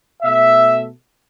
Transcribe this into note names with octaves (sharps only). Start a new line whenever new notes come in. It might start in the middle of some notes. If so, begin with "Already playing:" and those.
B2 A3 E5